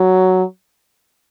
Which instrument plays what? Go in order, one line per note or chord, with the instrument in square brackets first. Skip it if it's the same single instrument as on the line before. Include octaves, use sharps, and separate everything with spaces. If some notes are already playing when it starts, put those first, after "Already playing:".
Already playing: [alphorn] F#3